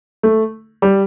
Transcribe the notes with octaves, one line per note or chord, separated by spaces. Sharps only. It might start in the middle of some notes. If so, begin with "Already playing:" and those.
A3
G3